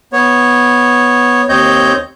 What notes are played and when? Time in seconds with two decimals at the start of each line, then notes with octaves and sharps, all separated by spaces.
0.13 B3 C#5
1.49 D#2 C4 C#5 D#5 G6